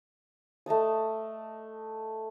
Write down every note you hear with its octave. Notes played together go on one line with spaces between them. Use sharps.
A3 D#5 A5 D#6